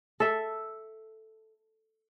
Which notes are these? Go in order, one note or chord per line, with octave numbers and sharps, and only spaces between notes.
A4 E5